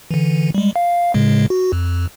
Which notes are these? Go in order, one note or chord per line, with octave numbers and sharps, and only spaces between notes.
D3 E3
G3 G#3
F5
A2 C#3 G#3
F#4
F2